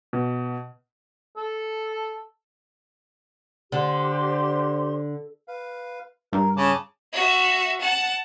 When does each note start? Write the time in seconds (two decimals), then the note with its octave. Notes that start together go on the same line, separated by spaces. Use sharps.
0.13 B2
1.37 A4
3.72 D3 G4 C5 C6
5.48 B4 F5
6.33 G2 A#4
6.57 C#3 A5 D6
7.13 F#4 E5
7.80 F#5 A5